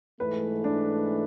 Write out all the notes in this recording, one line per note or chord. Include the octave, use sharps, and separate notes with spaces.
G#2 E3 A3 B4
D4